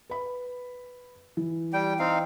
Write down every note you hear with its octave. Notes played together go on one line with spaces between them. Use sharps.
B4 B5
E3
G3 G5
C4 D#4 F5